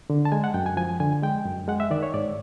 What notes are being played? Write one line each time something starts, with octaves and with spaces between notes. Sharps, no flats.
D3
A5
G#3 G#5
F#5
F#2 G5
G#5
F3 G#5
D3 G#5
G#3 G5
F#2
G#3 F#5
E5
D#3 D5
C#5
G#2 D5